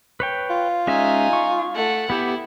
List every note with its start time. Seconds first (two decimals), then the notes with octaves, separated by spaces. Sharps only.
0.20 B4 C#5 G5
0.50 F4
0.87 G#3 C#4 D#4 E5 G#5
1.33 C#6
1.75 A3 F#5
2.10 B3 E4 G4